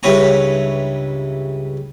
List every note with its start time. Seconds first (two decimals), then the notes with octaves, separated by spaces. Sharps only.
0.03 C#2 G2 E4 B4 C#5 A#5